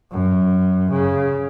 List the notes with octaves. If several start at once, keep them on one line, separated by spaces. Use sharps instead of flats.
F#2
C#3